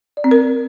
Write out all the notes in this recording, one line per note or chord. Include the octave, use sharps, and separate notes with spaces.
D5
C4
A#4